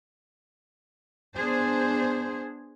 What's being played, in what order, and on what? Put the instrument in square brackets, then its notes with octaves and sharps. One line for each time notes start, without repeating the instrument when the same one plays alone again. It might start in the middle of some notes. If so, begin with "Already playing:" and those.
[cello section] B3 D4 G#4 C5